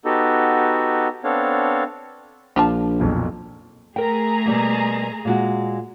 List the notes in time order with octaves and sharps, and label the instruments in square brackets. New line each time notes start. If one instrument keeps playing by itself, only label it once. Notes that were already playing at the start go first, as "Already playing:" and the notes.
[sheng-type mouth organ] B3 D#4 F#4 G4 A4
B3 C4 D4 A4 C#5 F5
[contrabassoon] A#1 [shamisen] D4 F4 A5
[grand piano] B1 F2 A#2
[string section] A3 G#4 A#5 [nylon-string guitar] A#4 G5
[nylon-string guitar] B2 G3 A#3
A#2 G#3 F#4